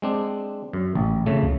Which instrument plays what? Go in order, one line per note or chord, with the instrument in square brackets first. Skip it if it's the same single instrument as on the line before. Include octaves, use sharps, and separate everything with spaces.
[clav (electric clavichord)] G#3 C4 D4
F#2
[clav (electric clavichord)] A1 [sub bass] A2
[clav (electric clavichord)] F2 C#3 A3
[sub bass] C#2